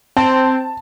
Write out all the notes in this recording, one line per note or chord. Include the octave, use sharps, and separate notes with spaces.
C4 A5